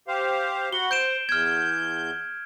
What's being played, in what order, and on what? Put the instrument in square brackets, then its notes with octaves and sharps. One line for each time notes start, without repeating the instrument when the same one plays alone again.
[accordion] G4 C5 F5
[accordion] F#4 F#5 B5 [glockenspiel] G7
[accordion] C5 [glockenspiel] G6 D7 E7
[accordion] E2 G6 [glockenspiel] F6 G#6